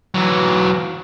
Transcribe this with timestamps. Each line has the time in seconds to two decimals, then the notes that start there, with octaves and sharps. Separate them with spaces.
0.14 E3 F#3